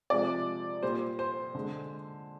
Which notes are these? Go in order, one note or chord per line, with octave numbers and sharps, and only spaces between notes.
C3 F3 G#3 D5
A#2 G3 C5
C5
D3 G#3